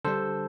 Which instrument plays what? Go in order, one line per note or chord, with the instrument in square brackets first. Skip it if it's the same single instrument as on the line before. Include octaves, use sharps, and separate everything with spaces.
[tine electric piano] D3 G3 D4 A4 C5